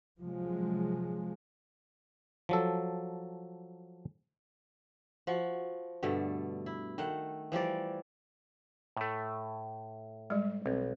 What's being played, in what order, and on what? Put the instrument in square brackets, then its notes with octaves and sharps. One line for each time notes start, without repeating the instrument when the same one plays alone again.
[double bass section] C3 F3 F#3 G#3
[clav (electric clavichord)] F3 F#3 A4
[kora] F3 F#4
G2 B2 D3 A3
E4
D#3 A3 F#5
E3 F3 G3 D5
[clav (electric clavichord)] A2 A3
[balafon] G3 G#3
[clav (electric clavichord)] B1 [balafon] C4